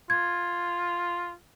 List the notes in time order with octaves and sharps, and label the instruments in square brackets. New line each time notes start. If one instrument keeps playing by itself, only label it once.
[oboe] F4 [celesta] G#6